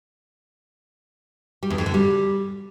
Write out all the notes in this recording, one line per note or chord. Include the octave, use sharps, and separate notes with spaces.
G3
E2
F2
D3
G3